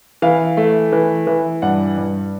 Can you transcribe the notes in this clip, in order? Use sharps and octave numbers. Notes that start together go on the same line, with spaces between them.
E3 F5
A3
E3
E3
G2 F#5
G2